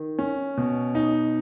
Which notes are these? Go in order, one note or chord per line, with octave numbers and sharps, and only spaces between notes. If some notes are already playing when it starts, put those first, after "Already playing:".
Already playing: D#3
C#4
B2
D#4